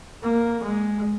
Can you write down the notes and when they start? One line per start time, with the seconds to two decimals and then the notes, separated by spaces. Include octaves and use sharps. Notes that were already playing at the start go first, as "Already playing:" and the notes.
0.23 A#3
0.63 G#3